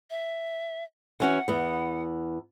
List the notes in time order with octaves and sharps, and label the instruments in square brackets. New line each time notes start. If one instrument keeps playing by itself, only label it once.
[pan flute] E5
[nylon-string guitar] E3 C#4 F#4 [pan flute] F#5
[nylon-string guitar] E2 B3